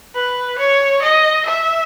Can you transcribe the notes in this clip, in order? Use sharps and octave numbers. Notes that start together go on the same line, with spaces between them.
B4
C#5
D#5
E5